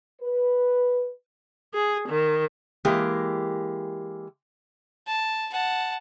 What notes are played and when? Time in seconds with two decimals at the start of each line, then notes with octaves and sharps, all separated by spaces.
0.21 B4
1.74 G#4
2.08 D#3
2.85 E3 G#3 A#3 G4
5.07 A5
5.52 F#5 A5